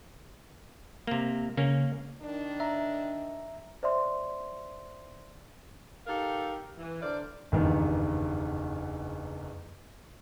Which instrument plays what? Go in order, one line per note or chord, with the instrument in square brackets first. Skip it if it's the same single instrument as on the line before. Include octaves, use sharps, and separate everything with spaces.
[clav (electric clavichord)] C3 A#3
[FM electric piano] C#3 [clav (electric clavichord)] A#3 C#4
[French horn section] D#3 D4
[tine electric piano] E5 A#5
[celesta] C5 D5 E5 C6
[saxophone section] D#4 G4 A4 A#4 F5
E3
D3 D4 A#4 C5 D5
[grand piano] F#1 E2 G2 D#3